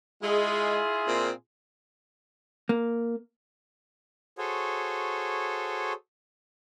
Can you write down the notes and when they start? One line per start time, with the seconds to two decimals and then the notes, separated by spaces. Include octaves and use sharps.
0.23 G#3 E4 F4 G#4
1.08 A#2 C4
2.69 A#3
4.38 F#4 G#4 A4 C5 C#5